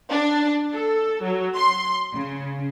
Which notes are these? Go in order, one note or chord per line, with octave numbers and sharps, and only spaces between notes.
D4
A4
F#3
C6
C#3